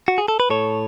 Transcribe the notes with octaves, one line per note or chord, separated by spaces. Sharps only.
F#4
G#4
A4
B4
A2 A4 C#5